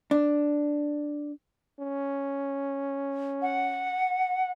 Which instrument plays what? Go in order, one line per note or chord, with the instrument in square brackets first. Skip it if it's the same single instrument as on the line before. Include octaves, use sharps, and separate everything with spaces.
[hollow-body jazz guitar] D4
[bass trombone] C#4
[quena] F#5